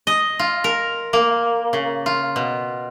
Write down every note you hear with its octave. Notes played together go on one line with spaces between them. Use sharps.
D#5
F4
A#4
A#3
C#3
F4
B2